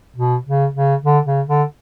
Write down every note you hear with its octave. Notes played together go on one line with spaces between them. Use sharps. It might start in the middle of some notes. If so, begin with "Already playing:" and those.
B2
C#3
C#3
D3
C#3
D3